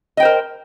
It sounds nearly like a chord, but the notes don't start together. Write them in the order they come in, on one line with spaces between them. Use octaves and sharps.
D#5 G5 C5 A#4